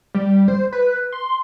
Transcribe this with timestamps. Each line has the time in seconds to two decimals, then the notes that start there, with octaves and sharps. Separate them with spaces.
0.15 G3
0.48 C5
0.72 B4
1.13 C6